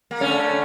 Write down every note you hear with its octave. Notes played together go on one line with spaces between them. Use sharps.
A#3
D3 A3 C#4